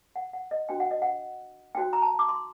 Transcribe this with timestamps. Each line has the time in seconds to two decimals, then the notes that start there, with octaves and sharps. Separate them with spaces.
0.16 F#5
0.33 F#5
0.51 D#5
0.69 D4 F#4 C5 G5
0.80 F#5
0.91 D#5
1.02 F#5
1.75 D#4 F#4 C5 G5
1.93 A#5
2.02 A5
2.19 D6
2.29 C6